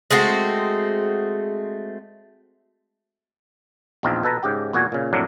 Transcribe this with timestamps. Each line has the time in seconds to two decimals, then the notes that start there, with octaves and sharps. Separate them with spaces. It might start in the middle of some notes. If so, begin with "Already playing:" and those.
0.11 G#3 A3 C4 F#4
4.03 A#1 E2 C4 D#4 F4
4.23 B2 A4 B4 A#5
4.43 G#2 C#3 G4 G5
4.73 E2 A#2 F#4 G#5
4.92 A#2 C#3
5.13 F2 A2 F#3 A#3 D4